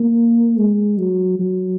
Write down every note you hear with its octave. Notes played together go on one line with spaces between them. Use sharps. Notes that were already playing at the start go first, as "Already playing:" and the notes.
Already playing: A#3
G#3
F#3
F#3